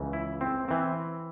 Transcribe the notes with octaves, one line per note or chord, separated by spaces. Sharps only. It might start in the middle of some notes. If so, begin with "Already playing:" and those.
Already playing: C#2 C#3 E3
E4
C4
E3 C4